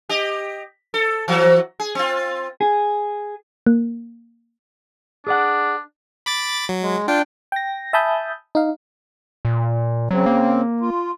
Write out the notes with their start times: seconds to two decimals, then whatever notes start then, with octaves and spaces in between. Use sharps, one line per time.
0.09 G4 D#5
0.94 A4
1.28 E3 F#3 F#4
1.80 G#4
1.95 C4 F4
2.61 G#4
3.66 A#3
5.27 D4 G#4 D5 F#5
6.26 B5 D6 A6
6.69 F#3
6.83 G#3
7.08 D4 F4 G5
7.52 G5 A#6
7.93 E5 G#5 A5 B5 D#6 G6
8.55 D#4 F5
9.45 A#2
10.11 C#3 F#3 C4
10.26 A#3
10.80 F4